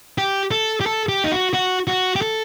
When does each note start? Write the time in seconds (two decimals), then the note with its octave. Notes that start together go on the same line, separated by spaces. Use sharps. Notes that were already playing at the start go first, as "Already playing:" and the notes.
0.18 G4
0.51 A4
0.81 G4
0.86 A4
1.09 G4
1.24 D#4
1.32 F#4
1.53 F#4
1.88 F#4
2.16 G4
2.22 A4